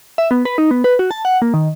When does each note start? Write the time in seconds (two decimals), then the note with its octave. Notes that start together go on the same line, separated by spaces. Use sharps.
0.18 E5
0.31 B3
0.45 B4
0.58 D#4
0.71 B3
0.84 B4
0.99 F#4
1.11 A5
1.25 F#5
1.42 A#3
1.54 D#3